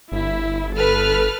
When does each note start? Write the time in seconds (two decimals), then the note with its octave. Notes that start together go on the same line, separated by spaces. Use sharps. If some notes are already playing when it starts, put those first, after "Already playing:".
0.12 G1 E4
0.75 A4 B4 F6